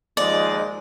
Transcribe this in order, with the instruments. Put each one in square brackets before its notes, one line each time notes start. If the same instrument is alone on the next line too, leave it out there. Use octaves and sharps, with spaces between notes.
[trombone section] D#2 F3 G#3 [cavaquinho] D5 [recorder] D#5